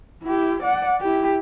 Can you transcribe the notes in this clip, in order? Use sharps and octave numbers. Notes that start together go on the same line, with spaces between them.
E4 G4
D5 F#5
E4 G4